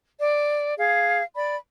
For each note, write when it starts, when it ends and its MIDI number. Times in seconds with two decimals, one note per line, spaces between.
0.19 0.73 74
0.76 1.21 68
0.76 1.21 77
1.35 1.56 74
1.35 1.56 83